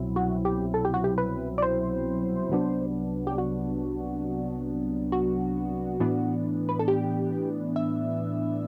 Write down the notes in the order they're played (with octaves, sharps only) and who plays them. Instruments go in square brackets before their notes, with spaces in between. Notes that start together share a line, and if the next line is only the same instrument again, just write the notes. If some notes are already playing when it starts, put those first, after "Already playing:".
Already playing: [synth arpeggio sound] C2 B2 F#3 C4 E4
F#4
G4
A4
G4
F#4
G4
B4
D5
C5
C2 C3 F#3 B3 D4
G4
F#4
F#4
A2 E3 B3 D4
B4
A4
G4
E5